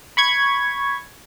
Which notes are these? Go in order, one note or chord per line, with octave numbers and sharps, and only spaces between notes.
B5 C#6 G#6